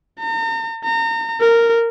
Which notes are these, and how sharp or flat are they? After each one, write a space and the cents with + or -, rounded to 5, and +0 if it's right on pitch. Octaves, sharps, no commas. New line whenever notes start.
A#5 -40
A#5 -35
A#4 -10